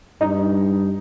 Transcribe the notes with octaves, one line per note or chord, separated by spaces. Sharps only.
G2 D#4